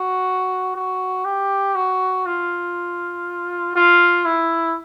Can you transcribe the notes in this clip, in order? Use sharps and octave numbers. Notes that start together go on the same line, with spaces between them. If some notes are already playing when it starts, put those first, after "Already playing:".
Already playing: F#4
F#4
G4
F#4
F4
F4
E4